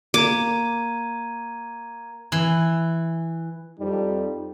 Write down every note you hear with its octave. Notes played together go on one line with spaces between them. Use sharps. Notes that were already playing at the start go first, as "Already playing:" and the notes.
A#3 A#5 D6 G#6 D#7
E3
F2 G3 D#4